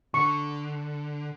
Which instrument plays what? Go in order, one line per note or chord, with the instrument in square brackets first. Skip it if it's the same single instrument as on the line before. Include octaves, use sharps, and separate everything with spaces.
[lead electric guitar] D3 [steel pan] C#6